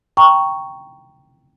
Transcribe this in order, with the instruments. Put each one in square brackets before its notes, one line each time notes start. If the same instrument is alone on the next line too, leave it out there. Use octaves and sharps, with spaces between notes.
[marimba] G5 A#5 C#6